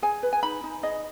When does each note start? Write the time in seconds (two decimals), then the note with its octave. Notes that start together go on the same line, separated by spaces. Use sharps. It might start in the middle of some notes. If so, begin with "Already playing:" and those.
0.02 G#4 G#5
0.23 B4
0.33 G#5
0.43 D#4 B5
0.64 D#4
0.83 G#4 D#5